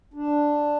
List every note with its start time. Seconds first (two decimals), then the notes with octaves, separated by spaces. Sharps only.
0.14 D4